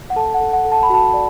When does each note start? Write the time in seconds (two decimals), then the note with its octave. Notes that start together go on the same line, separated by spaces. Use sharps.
0.10 F#5
0.16 A4 A5
0.34 F#5
0.41 A4
0.53 F#5
0.65 A4
0.72 A5
0.83 B5
0.90 F#4 A5
1.14 D5